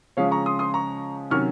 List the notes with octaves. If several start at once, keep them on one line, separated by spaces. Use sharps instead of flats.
C#3 F3 G#3 C#4 C#5 F5
A#5 C#6
C6 D#6
C6 D#6
A#5 C#6
C3 D#3 F#3 C#4 C#6 F6